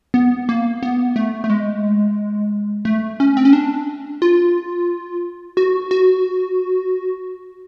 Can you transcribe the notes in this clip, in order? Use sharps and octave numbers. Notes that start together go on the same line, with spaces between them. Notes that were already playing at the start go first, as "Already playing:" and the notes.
B3
A#3
B3
A3
A3
G#3
A3
C#4
C4
C#4
D4
F4
F#4
F#4